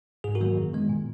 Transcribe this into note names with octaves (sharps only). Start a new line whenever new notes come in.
G#2 G#4
F#4 A#4
D#3 F#3 A#3
F#2
D#3 G#3 B3
A#2